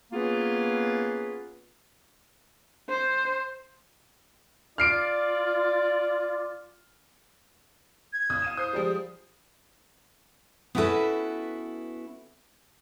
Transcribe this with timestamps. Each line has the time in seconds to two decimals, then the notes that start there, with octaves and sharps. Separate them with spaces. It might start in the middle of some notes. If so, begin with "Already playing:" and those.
0.12 A#3 B3 C#4 F4 G#4 B4
2.89 C5
4.78 F4 D5 F6 C7 D7
8.13 G#6
8.30 B1 B2 D#6
8.42 F5 D#7 E7
8.57 C5 D#6 G6 C7
8.73 F3 G3 G#3
10.75 B3 C#4 E4 F#4 A4 B4